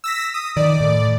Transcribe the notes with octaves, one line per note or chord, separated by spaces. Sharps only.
E6 A#6 B6
D#6
D#3 D5
A2